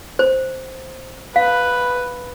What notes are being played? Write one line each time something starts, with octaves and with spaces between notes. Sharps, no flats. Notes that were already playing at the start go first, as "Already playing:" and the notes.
C5
B4 F5